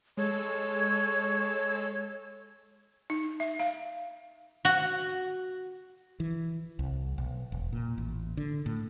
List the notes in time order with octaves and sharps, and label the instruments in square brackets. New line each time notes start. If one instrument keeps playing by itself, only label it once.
[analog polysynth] G#3 A4 E6 [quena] C#5
[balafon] D#4
E5
F5
[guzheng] F#4
[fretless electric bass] E3
C2
B1
E1
A#2
A1
D3
A2